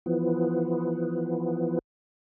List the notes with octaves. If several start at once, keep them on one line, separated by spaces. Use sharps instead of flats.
E3 F3 B3